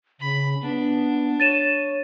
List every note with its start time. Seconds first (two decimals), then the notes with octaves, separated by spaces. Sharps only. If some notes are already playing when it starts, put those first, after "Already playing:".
0.20 C#3 B5
0.61 B3 D4
1.40 C#5 A6 D#7 E7